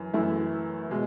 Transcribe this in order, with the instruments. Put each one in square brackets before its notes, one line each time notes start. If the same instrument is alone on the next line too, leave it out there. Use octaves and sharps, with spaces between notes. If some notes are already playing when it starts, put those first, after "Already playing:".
Already playing: [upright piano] F#2 E3
F#2 E3 A3 E4
B2 G#3